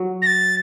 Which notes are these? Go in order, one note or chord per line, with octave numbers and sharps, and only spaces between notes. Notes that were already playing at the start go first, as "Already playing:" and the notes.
Already playing: F#3
A#6
A6